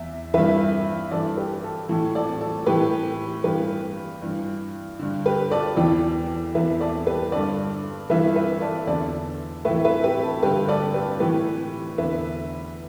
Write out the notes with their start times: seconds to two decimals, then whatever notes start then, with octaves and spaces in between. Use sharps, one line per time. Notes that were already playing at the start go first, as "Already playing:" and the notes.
Already playing: E2 E5
0.34 G2 E3 B4 E5
1.11 G2 E3 A4 D5
1.37 G4 B4
1.63 A4
1.89 A2 E3 A4
2.15 A4 D5
2.41 A4
2.66 A2 E3 G4 B4
3.44 G2 E3 G4 B4
4.22 G2 E3
4.99 G2 D3
5.25 G4 B4
5.51 A4 D5
5.77 E2 E3 D5 G5
6.54 E2 E3 B4 E5
6.81 A4 D5
7.07 G4 B4
7.32 G2 D3 A4 D5
8.09 G2 E3 B4 E5
8.36 B4 E5
8.61 A4 D5
8.87 E2 D3 A4 D5
9.65 A2 B4 E5
9.69 E3
9.84 B4 E5
10.03 G4 B4
10.23 A4
10.42 G2 D3 G4 B4
10.69 A4 D5
10.94 G4 B4
11.20 A2 E3 G4 B4
11.98 E2 D3 B4 E5